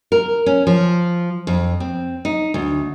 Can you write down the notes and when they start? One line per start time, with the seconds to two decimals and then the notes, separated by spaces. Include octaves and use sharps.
0.12 A#4
0.46 C#4
0.67 F3
1.47 F2
1.80 C4
2.25 D#4
2.54 D2